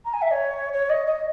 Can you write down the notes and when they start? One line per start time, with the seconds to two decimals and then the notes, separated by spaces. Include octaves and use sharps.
0.05 A#5
0.13 G#5
0.22 E5
0.31 C#5
0.73 C#5
0.89 D#5
1.06 D#5